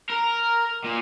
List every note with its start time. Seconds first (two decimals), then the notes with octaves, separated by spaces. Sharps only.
0.10 A#4
0.84 A#2